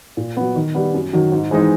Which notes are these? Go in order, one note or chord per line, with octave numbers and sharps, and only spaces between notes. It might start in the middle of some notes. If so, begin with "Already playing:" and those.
A#2
F#3 B3
D#3
G3 B3
F#2
D#3 F#3
G#2
E3 G#3 C4 D#4